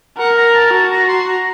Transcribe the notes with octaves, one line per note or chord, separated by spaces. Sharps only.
A#4 F#5
A#5
A5
F#4 A5
A#5
C6
A#5